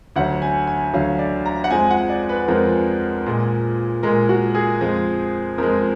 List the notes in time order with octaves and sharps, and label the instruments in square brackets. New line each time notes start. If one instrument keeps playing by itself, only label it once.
[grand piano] D2 D3 F#3 F#5
G#5
G#5
D2 D3 F#3 F5
D5
A#5
F#5
F2 F3 G#3 G#5
F#5
D5
B4
F2 F3 G#3 A#4
A#2 G#3
A#2 G#3 A#4
F#4
G#4
F2 F3 G#3
F2 F3 G#3 A#4